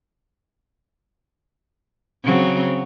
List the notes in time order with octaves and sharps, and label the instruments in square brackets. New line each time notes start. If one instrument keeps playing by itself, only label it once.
[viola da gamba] C#3 F#3 C4